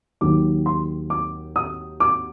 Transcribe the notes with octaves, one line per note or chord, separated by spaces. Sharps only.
D#2 D#3 F#3 D6
C6
D6
D#6
D6